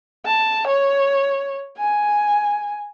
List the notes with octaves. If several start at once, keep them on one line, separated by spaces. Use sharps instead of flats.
A5
C#5
G#5